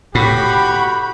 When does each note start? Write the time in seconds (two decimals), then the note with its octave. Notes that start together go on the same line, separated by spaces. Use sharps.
0.15 A2 F#4 G4 B5